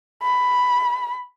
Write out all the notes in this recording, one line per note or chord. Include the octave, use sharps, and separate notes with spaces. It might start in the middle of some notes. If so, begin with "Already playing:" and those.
B5